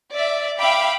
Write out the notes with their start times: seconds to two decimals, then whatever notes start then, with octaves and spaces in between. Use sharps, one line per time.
0.13 D5 E5
0.59 E5 F5 G5 B5 D6